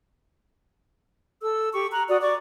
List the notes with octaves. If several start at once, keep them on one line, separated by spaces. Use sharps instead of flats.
A4 E6
G4 C#6
A#5 F#6
F#4 D5 D#6
D5 C#6 D6